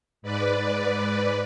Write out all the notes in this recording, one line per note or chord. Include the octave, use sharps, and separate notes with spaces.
G#2 B4 D5